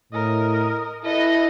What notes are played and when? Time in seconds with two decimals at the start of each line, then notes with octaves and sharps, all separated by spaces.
0.13 A2 A#4 D#5
1.05 E4 A4 B4 D#5